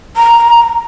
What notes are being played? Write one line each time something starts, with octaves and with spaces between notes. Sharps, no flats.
A#5